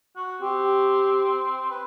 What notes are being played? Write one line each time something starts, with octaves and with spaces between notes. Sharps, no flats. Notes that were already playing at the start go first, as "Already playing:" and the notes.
F#4
C4 G4
B4